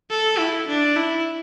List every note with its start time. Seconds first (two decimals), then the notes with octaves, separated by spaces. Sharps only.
0.10 A4
0.39 E4
0.68 D4
0.96 E4